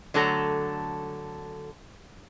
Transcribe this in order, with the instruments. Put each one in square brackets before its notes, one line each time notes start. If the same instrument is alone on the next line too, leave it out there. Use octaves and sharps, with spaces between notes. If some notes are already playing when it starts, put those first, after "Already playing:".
[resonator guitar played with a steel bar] D3 F#3 A3 A4 B4 A#5